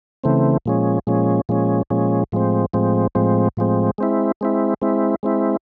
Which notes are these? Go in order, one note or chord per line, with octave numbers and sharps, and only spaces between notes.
C#3 E3 A3 C4
A#2 F3 G#3 C#4
A#2 F3 G#3 C#4
A#2 F3 G#3 C#4
A#2 F3 G#3 C#4
A2 F3 G#3 C4
A2 F3 G#3 C4
A2 F3 G#3 C4
A2 F3 G#3 C4
G#3 C4 E4
G#3 C4 E4
G#3 C4 E4
G#3 C4 E4